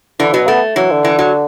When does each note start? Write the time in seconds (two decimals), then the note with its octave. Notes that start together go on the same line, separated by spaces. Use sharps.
0.19 D3 E3
0.33 B2 F#3
0.47 A3 B3
0.76 E3 F#3
0.91 D3
1.05 E3
1.19 F#3